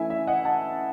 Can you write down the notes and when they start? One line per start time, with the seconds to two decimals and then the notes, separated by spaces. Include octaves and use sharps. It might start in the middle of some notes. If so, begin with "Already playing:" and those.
Already playing: E3 A3 C#4 E4 E5 G#5
0.10 E5
0.27 D#5 F#5
0.45 F#5 A5